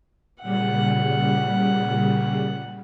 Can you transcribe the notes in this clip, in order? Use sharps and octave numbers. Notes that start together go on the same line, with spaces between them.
A#2 C#3 G3 F#5